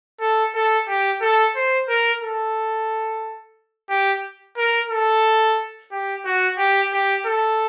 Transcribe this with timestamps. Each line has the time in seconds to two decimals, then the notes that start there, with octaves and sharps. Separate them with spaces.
0.20 A4
0.54 A4
0.88 G4
1.21 A4
1.56 C5
1.89 A#4
2.22 A4
3.89 G4
4.57 A#4
4.90 A4
5.92 G4
6.25 F#4
6.58 G4
6.92 G4
7.26 A4